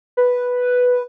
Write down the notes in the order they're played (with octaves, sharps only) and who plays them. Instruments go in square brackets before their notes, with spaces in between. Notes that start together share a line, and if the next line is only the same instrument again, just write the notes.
[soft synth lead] B4